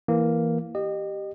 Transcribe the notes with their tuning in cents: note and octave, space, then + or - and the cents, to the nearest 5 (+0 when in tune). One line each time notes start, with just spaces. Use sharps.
E3 +0 A#3 +0
G4 +0 D#5 -30